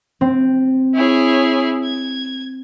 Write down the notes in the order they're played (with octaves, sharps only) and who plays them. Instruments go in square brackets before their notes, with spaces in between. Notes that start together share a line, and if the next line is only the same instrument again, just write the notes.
[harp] C4
[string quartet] E4 G#4 C#5
G#6